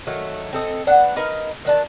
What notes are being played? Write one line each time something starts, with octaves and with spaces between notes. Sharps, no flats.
D#3 F#3 A3
C4 A4 D#5
B3 D4 F#5
D#4 A#4 B4 F5
D#3 D4 A5